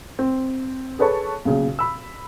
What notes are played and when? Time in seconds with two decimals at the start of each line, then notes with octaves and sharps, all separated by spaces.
0.19 C4
0.99 G#4 A4 B4 C#5 A5 C#6
1.45 B1 A#2 C#3
1.79 B5 E6